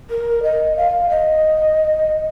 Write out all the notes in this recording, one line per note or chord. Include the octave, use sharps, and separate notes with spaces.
A#4
D#5
F5
D#5